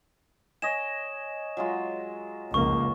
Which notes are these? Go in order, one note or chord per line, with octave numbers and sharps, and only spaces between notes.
C#5 D#5 G#5 E7
F#3 G#3 F4
F1 C#2 A#3 C#6